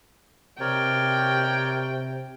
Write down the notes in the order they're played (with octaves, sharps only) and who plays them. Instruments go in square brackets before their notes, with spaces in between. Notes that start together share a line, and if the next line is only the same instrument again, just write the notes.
[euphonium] C3 [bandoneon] A#4 C#5 D5 [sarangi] G5